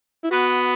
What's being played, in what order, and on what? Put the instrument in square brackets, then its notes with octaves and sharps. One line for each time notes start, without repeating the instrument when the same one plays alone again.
[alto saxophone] E4
[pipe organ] B3 B4 [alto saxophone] F#4